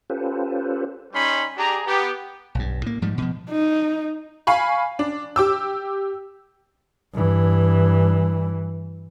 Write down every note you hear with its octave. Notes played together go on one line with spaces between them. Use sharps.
C#4 F4 G4 A4 B4 C5
G3 C#4 D#4 B5 C6
D4 G4 G#4 A#5
B3 G4
B1 G2
A2 A#3
G#2 F3 G3
B2 F3
D#4
F5 G#5 B5 C#6
D4
G4 D6 E6
G2 E3